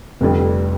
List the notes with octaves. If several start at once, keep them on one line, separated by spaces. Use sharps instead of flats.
F1 F2 D3 G3